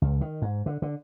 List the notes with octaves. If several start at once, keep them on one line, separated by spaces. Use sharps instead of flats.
C#2
D#3
G#2
D3
D3